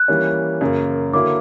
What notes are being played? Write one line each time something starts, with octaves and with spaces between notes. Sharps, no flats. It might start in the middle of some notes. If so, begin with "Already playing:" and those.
Already playing: F#6
E3 G3 A#3 C#4
F#2 C#3 F#3 A#3
D3 F#3 A#3 E4 D6